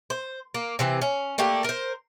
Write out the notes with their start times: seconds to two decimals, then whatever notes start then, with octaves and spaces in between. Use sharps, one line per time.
0.10 C5
0.54 A#3
0.79 C3 E3 C4
1.01 C#4
1.38 A3 A#3 D4 G4
1.64 A#4 C5